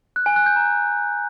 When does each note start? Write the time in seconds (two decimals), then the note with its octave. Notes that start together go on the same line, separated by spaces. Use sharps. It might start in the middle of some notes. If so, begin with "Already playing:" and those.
0.16 F#6
0.26 G#5
0.36 F#6
0.46 G6
0.56 A#5